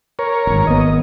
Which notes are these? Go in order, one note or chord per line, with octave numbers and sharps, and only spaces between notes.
A#4 C#5
D#1 G#1
G#1 B3 D#5